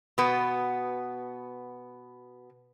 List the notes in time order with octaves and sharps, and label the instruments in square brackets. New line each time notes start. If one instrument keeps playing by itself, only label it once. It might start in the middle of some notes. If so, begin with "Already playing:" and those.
[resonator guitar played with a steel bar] B2 B3